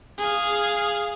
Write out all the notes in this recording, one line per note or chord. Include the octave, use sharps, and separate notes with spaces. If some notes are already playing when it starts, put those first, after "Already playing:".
G#4 F5